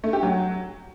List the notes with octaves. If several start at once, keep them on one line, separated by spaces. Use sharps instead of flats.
A3
G4
F#3